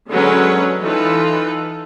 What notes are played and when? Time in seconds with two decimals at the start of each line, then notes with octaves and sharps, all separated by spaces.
0.10 D3 F#3 G#3 C#4 B4 C#5
0.81 E3 D#4 F4 A4 B4